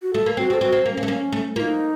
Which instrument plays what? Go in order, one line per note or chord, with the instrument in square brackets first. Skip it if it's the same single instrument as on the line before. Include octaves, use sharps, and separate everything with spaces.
[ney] F#4
[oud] A3 [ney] A4
[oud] A#3
[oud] C4 [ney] F#4
[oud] C4
[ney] A4
[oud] C4 [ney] F#4
[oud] C4
A#3
[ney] C#4
[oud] A#3
A3
[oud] A#3 [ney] C#4
[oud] A3
[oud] A#3 [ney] D#4 F4